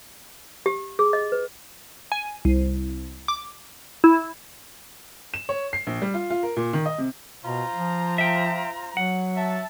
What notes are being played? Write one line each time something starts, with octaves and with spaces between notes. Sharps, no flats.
G4
G#4
D#5
B4
G#5
C2
D6
E4
E7
C#5
C7
A#1
G3
F4
F4
A#4
A#2
D#3
D#5
C3
B2 F4 C5 A#5
F3
E5 G5
F#3 F#5
E5 A5